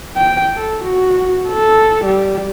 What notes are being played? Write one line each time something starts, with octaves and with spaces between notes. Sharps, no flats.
G5
A4
F#4
A4
G3